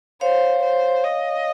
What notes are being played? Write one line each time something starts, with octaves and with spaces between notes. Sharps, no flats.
C5 C#5 F5
C5
D#5